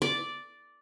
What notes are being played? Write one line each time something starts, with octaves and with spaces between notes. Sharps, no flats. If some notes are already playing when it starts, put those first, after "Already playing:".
D5